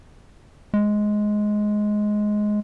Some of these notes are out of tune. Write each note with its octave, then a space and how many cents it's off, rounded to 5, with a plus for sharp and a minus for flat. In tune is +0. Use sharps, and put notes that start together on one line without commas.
G#3 +10